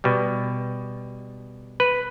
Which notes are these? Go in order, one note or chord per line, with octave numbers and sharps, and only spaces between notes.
B2 G3
B4